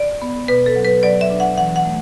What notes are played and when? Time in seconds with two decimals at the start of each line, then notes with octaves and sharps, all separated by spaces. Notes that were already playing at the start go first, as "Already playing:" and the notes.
Already playing: D5
0.22 B3
0.48 B2 B4
0.66 A4
0.76 F#3
0.85 B4
1.03 F#3 D5
1.21 E5
1.30 D4
1.40 F#5
1.57 E3 F#5
1.76 F#5
1.85 A3